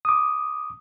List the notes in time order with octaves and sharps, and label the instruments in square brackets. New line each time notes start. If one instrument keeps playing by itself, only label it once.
[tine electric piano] D6 D#6